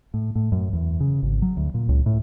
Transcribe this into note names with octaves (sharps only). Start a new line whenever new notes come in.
A2
A2
F#2
E2
C#3
G#1
F#3
D2
A#2
C#2
A2